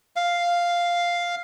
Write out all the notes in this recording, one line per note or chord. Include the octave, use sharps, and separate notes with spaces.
F5